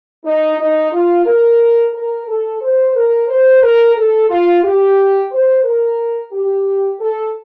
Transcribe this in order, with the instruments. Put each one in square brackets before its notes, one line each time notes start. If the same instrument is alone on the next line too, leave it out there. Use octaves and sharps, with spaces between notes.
[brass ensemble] D#4
D#4
F4
A#4
A#4
A4
C5
A#4
C5
A#4
A4
F4
G4
C5
A#4
G4
A4